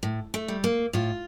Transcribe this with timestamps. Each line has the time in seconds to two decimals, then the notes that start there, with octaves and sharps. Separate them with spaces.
0.03 A2
0.34 A3
0.48 G3
0.64 A#3
0.93 A2 F4